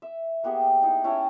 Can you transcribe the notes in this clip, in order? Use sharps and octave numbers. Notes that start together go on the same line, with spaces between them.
E5
A#3 B3 G4 G#4
D#4 E4
C#4 E4 G5 A5